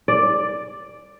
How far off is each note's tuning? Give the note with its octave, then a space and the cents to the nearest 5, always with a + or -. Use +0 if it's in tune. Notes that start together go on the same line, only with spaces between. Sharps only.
D5 +5